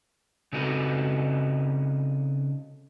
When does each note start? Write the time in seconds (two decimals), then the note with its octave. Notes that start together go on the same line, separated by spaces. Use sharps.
0.53 C#3 C4 D#4 F#4 A4 B4